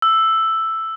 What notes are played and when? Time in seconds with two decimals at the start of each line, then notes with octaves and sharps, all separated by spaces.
0.02 E6